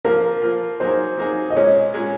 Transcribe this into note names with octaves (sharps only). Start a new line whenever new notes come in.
F3 A#3 F4 A#4
F3 A#3 F4
F#3 A#3 D#4 G#4 C5
F#3 A#3 D#4 G#4
D#5
A#2 G#3 C#4 C#5
A#2 G#3 C#4